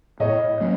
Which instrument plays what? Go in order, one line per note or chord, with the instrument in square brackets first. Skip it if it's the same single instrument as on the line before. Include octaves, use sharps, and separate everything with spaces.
[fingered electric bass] A2 [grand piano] C#5 D#5
[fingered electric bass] F#3 A#3 C#4